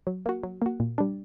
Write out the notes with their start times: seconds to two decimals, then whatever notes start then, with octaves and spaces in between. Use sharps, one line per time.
0.07 F#3
0.26 A#3 F#4
0.44 F#3
0.62 A#3 F#4
0.80 A#2
0.98 G3 D4